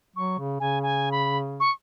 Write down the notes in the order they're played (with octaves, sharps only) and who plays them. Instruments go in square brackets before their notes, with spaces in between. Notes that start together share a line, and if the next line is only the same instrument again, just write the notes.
[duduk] F#3 [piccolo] C#6
[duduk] C#3
[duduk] C#3 [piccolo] G#5
[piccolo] G#5
B5
C#6